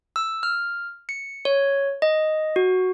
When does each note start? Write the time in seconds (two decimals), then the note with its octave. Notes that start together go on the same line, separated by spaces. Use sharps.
0.16 E6
0.43 F6
1.09 C#7
1.45 C#5
2.02 D#5
2.56 F#4